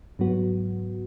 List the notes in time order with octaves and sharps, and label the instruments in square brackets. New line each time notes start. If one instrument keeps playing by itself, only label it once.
[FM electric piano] G#2 F#3 B3 F#4